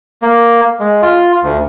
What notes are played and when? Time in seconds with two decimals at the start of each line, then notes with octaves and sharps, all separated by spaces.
0.22 A#3
0.80 G#3
1.02 F4
1.43 D2